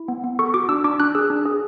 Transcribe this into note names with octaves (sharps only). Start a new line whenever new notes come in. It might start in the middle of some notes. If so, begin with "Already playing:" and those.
Already playing: E4
B3
B3
A4 C#6
F#4 D6
D4 E6
D4 D6
D4 F#6
G#4 E6
D4
G#4